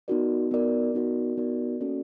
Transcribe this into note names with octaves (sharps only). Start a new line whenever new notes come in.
B3 D#4 F#4 A#4 D5
B3 D#4 F#4 A#4 D5
B3 D#4 F#4 A#4 D5
B3 D#4 F#4 A#4 D5
A#3 C#4 F#4 A4 D5